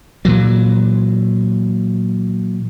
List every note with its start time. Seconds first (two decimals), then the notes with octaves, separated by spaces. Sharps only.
0.25 A#2 E3 F#3